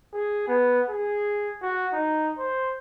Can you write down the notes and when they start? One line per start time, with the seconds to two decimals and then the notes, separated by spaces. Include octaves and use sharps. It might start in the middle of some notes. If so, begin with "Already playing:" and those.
0.13 G#4
0.48 B3
0.89 G#4
1.62 F#4
1.93 D#4
2.38 C5